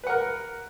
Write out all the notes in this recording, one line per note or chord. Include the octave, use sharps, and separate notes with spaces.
A#4 B4 F#5